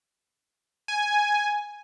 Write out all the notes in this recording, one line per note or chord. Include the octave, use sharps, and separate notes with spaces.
G#5